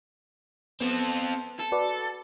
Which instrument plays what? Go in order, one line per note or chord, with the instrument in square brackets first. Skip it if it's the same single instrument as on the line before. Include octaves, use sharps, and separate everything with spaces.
[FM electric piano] B3 [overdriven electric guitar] C4 A4
[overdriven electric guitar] A4
[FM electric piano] F#4 B4 D5